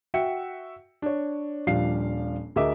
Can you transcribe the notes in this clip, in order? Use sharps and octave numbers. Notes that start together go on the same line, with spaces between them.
F#4 E5 G5 C#7
D4 C#5
D#1 F3 G3 D4 F5 C7
D2 G#4 A#4 D#5 E5 D6